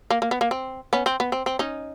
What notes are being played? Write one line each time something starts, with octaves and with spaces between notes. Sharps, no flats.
A#3
A#3
B3
A#3
C4
B3 C#4
C4
B3
C4
C4
C#4 D#4